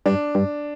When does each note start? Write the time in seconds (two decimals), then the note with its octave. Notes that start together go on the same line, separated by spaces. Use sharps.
0.06 G2 D4
0.35 G2